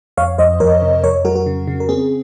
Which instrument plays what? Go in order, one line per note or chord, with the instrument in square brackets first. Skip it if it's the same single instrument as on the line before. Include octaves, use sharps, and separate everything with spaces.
[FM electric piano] F2 C#5 F5
F2 C5 D#5
F2 A#4 C#5
C3
F2 A#4 C#5
F#3 F#4 A#4
F#4 A#4
C#3
C#3
A#4
C4 G#4